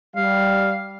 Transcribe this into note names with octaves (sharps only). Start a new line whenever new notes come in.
G3 F5